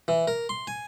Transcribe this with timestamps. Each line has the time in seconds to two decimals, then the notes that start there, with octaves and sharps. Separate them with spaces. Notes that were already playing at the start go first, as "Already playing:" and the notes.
0.08 E3
0.28 A#4
0.49 C6
0.67 G#5